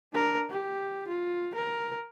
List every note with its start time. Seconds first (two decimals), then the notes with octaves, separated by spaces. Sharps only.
0.13 D4 A#4
0.50 G4
1.08 F4
1.55 A#4